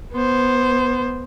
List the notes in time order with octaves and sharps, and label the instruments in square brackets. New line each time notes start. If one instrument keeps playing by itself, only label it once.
[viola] B3 C5